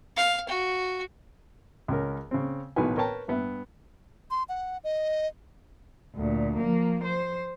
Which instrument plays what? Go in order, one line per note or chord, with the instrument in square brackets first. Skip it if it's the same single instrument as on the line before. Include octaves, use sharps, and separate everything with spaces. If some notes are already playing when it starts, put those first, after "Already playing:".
[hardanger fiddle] F5
F#4
[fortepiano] C#2 C#4 A#4
C#3 C4
B1 A2 D#3 F#4 B4 G#5
A#4 B4 C#5 G5 A5 A#5
G2 B3 E5
[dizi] C6
F#5
D#5
[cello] D2 A#2
F3 A#3
C5